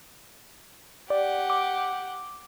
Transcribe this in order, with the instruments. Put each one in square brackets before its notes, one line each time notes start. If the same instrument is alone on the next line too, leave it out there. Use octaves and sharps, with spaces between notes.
[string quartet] G4 F#5 [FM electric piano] D5
[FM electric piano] D6